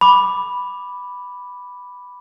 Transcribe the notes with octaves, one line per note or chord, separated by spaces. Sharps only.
B5 D6